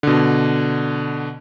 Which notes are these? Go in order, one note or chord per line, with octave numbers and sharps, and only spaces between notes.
B2 D3